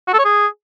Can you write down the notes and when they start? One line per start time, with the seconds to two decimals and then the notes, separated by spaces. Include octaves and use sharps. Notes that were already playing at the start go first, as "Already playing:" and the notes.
0.08 F#4
0.13 A4
0.19 C#5
0.25 G#4